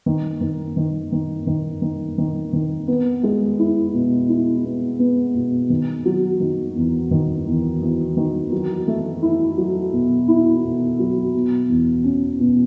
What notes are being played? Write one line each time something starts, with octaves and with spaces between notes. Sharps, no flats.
D#3
D#3
D#3
D#3
D#3
D#3
D#3
D#3
B3
G#3
E4
B2
E4
B3
B3
B2
D#3
F#3
D#3
E2
D#3
E2
E2
D#3
F#3
A3
E4
F#3
B2
E4
B2
F#3
B2
E2
C#4
B2